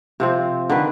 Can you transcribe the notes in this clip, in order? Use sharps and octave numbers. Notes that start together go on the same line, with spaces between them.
C3 F3 C4
D3 D#3 B4